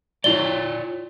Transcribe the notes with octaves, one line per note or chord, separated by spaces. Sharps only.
E4 F4 C#5 D5 G7